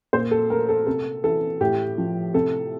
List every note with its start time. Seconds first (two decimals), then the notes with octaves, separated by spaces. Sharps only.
0.13 A#2 C5
0.31 A4
0.50 A3 A#4
0.69 A4
0.86 C3 A4
1.24 E3 A4
1.61 A2 G4
1.98 F3
2.34 C3 A4